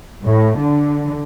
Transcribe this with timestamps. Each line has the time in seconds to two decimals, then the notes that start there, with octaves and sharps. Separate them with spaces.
0.24 A2
0.57 D3